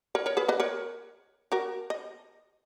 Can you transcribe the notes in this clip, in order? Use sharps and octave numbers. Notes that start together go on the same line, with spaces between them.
A#4 C#5
A#4 C#5
G#4 B4
B4 D#5
A#4 C#5
F#4 A#4
D#5